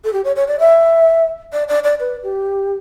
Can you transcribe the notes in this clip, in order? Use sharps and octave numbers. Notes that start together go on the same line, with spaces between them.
A4
G4
C#5
C#5
D5
E5
D5
D5
D5
B4
G4